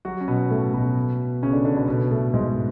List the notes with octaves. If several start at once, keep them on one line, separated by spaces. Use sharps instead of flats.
F#3 F#4
C#4
B2 B3
A2 A3
B2 B3
C#3 C#4
D3 D4
D3 D4
B2 B3
B2 B3
A2 A3
G#2 G#3